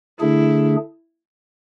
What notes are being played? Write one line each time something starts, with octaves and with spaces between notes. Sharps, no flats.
D3 A3 D4 E4 G#4